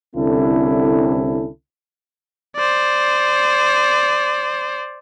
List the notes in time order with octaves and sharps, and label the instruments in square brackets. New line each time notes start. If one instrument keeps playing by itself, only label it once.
[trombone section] C2 D3 C4 C#4 E4 A4
[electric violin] C5 D5